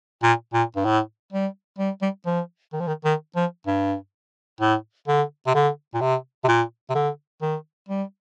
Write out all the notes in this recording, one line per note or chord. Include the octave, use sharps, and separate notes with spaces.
A#2
A#2
G2
A2
G3
G3
G3
F3
D#3
F3
D#3
D#3
F3
G2
A2
D3
C3
D3
A#2
C3
C3
A#2
C3
D3
D#3
G3